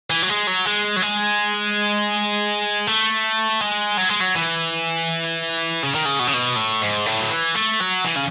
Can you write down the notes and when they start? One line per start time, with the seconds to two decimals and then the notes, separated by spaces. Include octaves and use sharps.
0.10 E3
0.23 F#3
0.29 G#3
0.47 F#3
0.65 G#3
0.96 F#3
1.02 G#3
2.87 A3
3.61 G#3
3.98 F#3
4.10 G#3
4.21 F#3
4.35 E3
5.83 C#3
5.95 D#3
6.05 C#3
6.19 B2
6.27 C#3
6.34 B2
6.56 A2
6.81 G#2
7.06 A2
7.21 F#3
7.30 E3
7.55 A3
7.80 F#3
8.05 E3
8.15 C#3